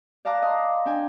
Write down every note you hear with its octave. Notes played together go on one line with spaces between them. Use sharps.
D5 F5 A5 A#5 D6 F#6
D#5 C6
D4 G5 G#5